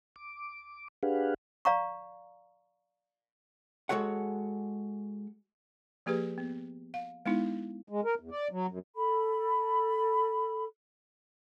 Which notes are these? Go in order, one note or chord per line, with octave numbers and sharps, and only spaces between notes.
D6
D4 G4 G#4 B4 F5 F#5
D5 F5 A#5 C#6
G#3 F#4 A4 C#5 F#5
F3 A#3 G4 G#4 B4
B3
F5
G#3 B3 D#4 E4
G#3
A#4
E2
D5
F#3
F#2
A4 B5